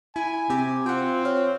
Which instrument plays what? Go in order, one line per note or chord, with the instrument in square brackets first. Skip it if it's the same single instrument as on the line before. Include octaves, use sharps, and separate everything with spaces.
[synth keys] E4 [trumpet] G#5
[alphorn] C3 [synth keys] C4 G4
[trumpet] C4 [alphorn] F4 [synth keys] F#5 G5
[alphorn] C#5 [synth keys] F5